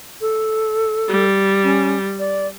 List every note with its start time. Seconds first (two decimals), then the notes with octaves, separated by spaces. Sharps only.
0.21 A4
1.08 G3
1.64 C#4
2.19 D5